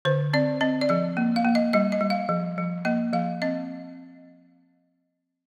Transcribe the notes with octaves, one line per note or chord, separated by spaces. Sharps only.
D3 C5
C4 D5
C4 D#5
D5
F3 D#5
A#3
F5
A#3
D#5
G3 D#5
D#5
G3
F5
F3
F3
A#3 D#5
F3 F5
C4 D#5